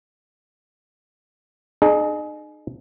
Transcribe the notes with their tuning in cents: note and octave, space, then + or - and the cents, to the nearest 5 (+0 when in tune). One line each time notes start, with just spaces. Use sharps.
D#4 -35 G#4 +25